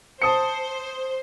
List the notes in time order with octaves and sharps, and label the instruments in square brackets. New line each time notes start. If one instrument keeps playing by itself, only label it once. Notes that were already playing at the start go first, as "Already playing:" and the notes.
[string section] C5 [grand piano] A5 D#6 C#7